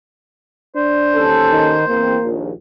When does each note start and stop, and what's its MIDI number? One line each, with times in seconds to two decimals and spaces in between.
0.76 1.26 62
0.76 2.27 72
1.15 1.77 39
1.15 1.77 61
1.15 1.77 69
1.52 1.86 51
1.88 2.16 40
1.88 2.35 58
1.88 2.16 60
2.23 2.51 34
2.23 2.51 39